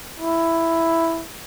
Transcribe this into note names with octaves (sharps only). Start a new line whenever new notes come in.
E4